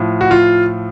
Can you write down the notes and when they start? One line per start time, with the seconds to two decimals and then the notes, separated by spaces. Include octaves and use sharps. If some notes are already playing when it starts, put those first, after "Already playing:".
Already playing: A2 F3
0.21 F#4
0.31 F4